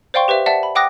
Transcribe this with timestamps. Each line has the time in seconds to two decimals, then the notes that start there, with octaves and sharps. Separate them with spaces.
0.14 C5 D5 F5 G5 C6 C#6
0.28 G4 B4 C5 E5
0.46 D5 E5 F#5 A5
0.63 B5
0.75 F#5 G5 D6 D#6 F#6 A#6